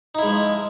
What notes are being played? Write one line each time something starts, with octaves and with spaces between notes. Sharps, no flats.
F3 G#3 D#4 E4